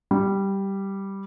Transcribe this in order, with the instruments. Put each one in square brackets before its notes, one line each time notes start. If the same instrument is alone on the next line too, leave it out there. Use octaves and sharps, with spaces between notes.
[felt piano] G3